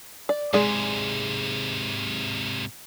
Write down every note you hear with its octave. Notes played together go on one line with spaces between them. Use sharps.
D5
G#2 C3 G#3 G#4 D5